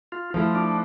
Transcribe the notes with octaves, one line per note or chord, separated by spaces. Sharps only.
F4
F3 A3 E4 F4
D4